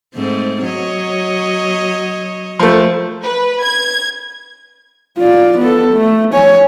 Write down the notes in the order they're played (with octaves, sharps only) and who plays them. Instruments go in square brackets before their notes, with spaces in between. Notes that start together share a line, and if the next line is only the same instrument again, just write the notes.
[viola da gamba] G#2 A3 C4
F#3 C#5 D#5
[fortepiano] F3 A3
[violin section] B4
G#6
[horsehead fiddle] F4 D5
B3 A4
A3
C#5 G#5